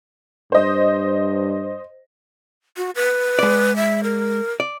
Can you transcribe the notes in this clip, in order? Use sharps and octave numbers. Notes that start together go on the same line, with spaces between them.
G2 C5 D#5
F#4
B4
G#3 D5
E5
A#4
D5